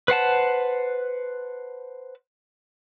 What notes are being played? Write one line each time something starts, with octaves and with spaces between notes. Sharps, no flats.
B4 C5 F#5 A5